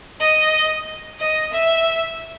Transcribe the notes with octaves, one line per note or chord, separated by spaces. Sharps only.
D#5
D#5
E5